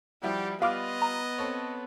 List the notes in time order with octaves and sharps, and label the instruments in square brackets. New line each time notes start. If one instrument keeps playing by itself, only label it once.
[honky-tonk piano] F3 E4 F#4 [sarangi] G3 [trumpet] G4
[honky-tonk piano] G3 F4 B5 [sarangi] B3 [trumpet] D#5 [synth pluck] F5 D6 F6
[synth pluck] A#5
[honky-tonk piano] C4 A4 C#5